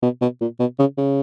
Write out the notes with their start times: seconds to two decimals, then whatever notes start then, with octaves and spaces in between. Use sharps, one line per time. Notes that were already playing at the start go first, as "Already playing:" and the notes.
0.03 B2
0.21 B2
0.41 A#2
0.60 B2
0.79 C#3
0.98 C#3